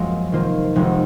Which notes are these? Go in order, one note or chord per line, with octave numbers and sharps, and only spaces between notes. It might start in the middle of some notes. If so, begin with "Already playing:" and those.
Already playing: F#2 F3 G#3 A#3 C4
C3 D#3 A#3 F4 C5
F1 F2 D#3 G#3